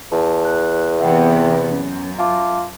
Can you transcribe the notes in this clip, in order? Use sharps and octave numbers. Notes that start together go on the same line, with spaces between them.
E2 A5
F#6
C3 E3 B3 E5 F#5 G5
F#2 C#4
F4 E5 A5 D6